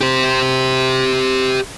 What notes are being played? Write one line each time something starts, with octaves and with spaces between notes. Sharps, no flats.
G4 C5